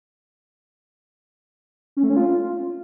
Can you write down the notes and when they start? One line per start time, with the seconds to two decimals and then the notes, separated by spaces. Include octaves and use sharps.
1.97 C#4
2.03 A3
2.10 C#4
2.16 F4